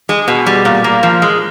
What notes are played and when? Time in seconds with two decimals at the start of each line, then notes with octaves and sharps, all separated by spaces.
0.09 G#3
0.28 B2
0.47 G3
0.65 A#2
0.84 A#3
1.03 F3
1.22 G#3